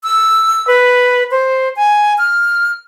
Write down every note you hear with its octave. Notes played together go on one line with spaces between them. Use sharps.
E6
B4
C5
G#5
F6